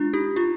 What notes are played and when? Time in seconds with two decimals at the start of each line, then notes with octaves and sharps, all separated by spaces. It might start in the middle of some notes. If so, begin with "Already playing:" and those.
Already playing: G#3 D4 F4
0.13 D#4 G4
0.36 D4 F4